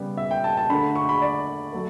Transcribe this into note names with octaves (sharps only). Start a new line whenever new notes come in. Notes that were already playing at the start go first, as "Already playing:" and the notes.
Already playing: C#3 G3 B3
E5
G5
A5
A5
D3 A3 B5
C#6
B5
D5
F#3 A3